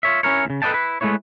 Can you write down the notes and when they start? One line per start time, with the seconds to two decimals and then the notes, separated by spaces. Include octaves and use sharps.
0.03 F4 C#5 E5
0.23 C#4 E4 A#4 C#5
0.45 D#2 C#3
0.62 A4 B4 D5 D#5 G5 A5
0.74 E4 B4
1.01 G#3 A3 B3 E4 C#5